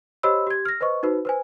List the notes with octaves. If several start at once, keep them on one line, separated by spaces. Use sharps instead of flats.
G4 C5 C#5 D#5 B5 E6
G4 G#6
F6 A#6
B4 C5 D#5 C#6
D#4 F#4 B4 C5
B4 C5 G#5